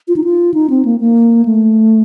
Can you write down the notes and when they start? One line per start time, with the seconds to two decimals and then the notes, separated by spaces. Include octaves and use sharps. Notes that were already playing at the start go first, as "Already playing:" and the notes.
0.08 F4
0.16 D#4
0.24 F4
0.54 D#4
0.70 C4
0.85 A#3
1.00 A#3
1.45 A3